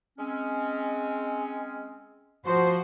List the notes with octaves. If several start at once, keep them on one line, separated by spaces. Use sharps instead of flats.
G#3 C4 C#4
F3 F#4 C5